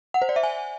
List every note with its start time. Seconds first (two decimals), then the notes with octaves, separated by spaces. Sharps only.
0.14 F#5
0.22 C5
0.29 D5
0.36 E5
0.43 G#5